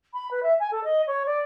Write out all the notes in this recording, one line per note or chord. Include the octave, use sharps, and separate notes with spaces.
B5
B4
E5
G#5
A4
D#5
C#5
D5